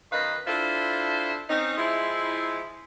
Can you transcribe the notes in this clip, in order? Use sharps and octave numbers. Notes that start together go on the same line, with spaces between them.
F#2 D#3 B4 D#5 F5
D4 E4 F4 A4 C5
C4 C#4 D#4
F3 G#3 E4